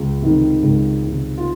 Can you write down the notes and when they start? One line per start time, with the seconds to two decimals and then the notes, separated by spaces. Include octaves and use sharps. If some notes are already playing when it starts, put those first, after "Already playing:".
Already playing: C#2
0.22 C3 D#3
0.63 C#2
1.05 C3 D#3
1.37 F4